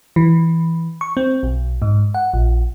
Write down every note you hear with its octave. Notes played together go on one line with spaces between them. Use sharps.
E3
C#6
C4
B1
G#2
F#5
A#1